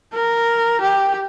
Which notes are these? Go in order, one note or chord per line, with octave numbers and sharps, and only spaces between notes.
A#4
G4